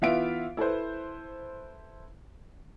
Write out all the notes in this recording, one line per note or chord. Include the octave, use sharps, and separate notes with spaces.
E3 B3 F4 E5 F5 D7
E4 A4 B4 C5